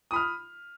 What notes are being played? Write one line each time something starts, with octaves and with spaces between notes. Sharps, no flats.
B5 D#6 F6